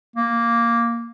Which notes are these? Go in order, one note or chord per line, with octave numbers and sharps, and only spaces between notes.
A#3